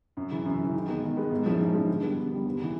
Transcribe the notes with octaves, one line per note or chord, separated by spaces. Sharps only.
F#2
C#3 E3
F#2
C#3 E3
D#3
G#3 B3
D#3
G#3 B3
G#2
F3 G#3 C#4 E4
G#2
F3 G#3 C#4 E4
D3
G3 B3
D3
G3 B3
D#2
C#3 E3